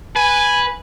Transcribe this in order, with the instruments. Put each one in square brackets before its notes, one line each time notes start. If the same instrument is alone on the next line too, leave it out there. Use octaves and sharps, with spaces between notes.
[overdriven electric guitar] B4 [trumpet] G#5